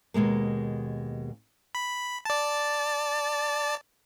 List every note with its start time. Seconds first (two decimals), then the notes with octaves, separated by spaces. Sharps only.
0.14 D#2 B2 G#3 A#3
1.75 B5
2.25 D5 A5